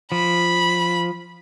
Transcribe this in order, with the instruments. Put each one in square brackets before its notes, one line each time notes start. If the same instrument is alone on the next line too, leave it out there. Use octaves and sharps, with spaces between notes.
[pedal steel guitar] F3 [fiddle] B5